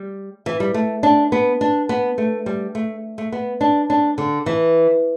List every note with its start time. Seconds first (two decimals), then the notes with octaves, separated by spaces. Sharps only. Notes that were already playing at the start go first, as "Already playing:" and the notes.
Already playing: G3
0.46 E3
0.60 G3
0.74 A3
1.03 D4
1.32 B3
1.61 D4
1.89 B3
2.18 A3
2.46 G3
2.75 A3
3.18 A3
3.32 B3
3.61 D4
3.90 D4
4.18 D3
4.46 E3